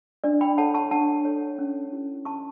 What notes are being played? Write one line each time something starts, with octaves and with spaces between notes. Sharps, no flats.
D4 D5
G5 B5
A4 C#5 F#5 A5
A5 C#6
D4 F#5 A5
A4 C#5
C#4
E4 G4
C#4 A5 C#6